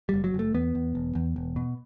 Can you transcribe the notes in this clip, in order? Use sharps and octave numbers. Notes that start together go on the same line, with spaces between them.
F#1 G3
F#3
F#1 A3
E2 B3
E2
E1
E2
E1
B2